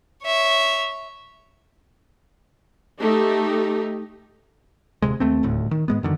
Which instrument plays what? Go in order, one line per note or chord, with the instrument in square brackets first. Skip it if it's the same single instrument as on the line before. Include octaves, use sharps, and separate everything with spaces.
[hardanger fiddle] C#5 E5
[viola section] A3 D#4 G4
[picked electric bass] D#1 E2 C3 G#3
D#2 A3 C4
D#1 D2 A2
D#3
G#2 G#3 B3
F#2 D3 D#3